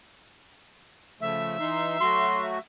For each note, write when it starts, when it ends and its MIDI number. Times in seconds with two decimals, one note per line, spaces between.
1.21 1.58 49
1.21 1.58 53
1.21 1.58 57
1.21 2.60 76
1.60 1.98 52
1.60 1.98 63
1.60 1.98 84
2.01 2.59 54
2.01 2.59 57
2.01 2.59 66
2.01 2.41 84